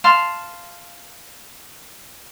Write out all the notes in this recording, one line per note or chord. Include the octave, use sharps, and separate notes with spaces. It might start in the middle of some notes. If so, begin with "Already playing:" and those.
F5 A5 C6